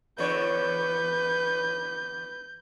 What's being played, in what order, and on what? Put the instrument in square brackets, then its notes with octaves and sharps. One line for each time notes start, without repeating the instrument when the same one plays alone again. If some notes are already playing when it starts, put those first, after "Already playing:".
[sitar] E2 D3 C#5 [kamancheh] B4 [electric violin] G6